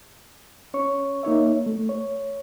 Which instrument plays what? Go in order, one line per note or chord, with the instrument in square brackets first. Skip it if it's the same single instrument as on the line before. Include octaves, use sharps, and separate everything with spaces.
[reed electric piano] C#4 C#5 C#6
A#3 D#4 C#5 E5
A3
C#5